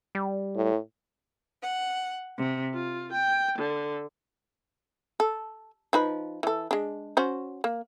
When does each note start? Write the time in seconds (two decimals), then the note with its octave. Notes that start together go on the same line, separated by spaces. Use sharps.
0.15 G3
0.56 A2
1.63 F#5
2.37 C3
2.73 F4
3.12 G5
3.58 D3
5.20 A4
5.93 F3 D#4 B4
6.43 E3 A4
6.71 G#3 D4
7.17 C#4 F#4 C5
7.64 A#3